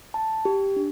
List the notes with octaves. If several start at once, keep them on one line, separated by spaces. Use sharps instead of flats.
A5
G4
D4